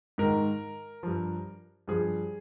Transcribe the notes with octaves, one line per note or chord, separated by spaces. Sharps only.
G#2 D#3 A#4
G2 F3
G2 F3 G#4